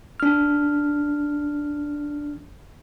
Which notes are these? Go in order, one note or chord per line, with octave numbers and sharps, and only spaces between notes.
D4 F6